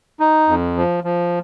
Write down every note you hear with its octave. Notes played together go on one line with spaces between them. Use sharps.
D#4
F2
F3
F3